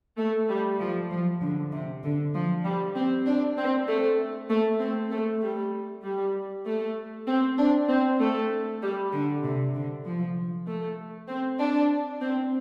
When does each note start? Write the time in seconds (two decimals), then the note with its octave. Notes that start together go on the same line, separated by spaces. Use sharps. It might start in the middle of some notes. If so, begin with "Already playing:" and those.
0.18 A3
0.49 G3
0.80 F3
1.10 F3
1.41 D3
1.72 C3
2.03 D3
2.34 F3
2.65 G3
2.96 C4
3.26 D4
3.57 C4
3.88 A3
4.50 A3
4.80 C4
5.11 A3
5.42 G3
6.04 G3
6.66 A3
7.27 C4
7.58 D4
7.89 C4
8.20 A3
8.82 G3
9.12 D3
9.43 C3
9.74 D3
10.05 F3
10.67 A3
11.29 C4
11.59 D4
12.21 C4